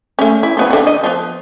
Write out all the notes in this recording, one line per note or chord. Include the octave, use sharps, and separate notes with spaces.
A3 C#4
E4
F3 B3 B4
D3 F#5
D#5
F3 B3